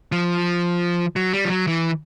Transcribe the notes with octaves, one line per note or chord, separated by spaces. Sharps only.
F3
F#3
G3
F3
F#3
E3